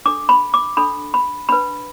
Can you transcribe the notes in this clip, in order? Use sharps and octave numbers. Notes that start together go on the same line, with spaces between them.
D4 A4 D6
B5
D6
D4 A4 B5
B5
D4 B4 B5